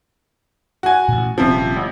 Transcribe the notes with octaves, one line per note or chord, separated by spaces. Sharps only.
F#4 G#5
A1 A#2
D#1 C3 F3 C4 C#4
A1